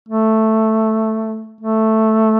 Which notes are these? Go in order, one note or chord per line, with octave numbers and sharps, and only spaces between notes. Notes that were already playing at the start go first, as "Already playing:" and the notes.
A3
A3